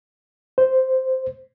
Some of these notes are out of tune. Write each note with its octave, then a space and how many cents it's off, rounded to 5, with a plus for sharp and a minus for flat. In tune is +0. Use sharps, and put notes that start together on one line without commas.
C5 -5